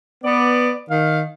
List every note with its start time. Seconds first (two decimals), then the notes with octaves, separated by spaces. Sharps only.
0.24 B3 D5
0.89 D#3 F5